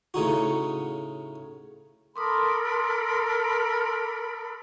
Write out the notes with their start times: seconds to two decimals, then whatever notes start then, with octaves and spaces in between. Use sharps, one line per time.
0.14 A2 C#3 D#4 F#4
2.16 A4 A#4 B5 C6 D6 D#6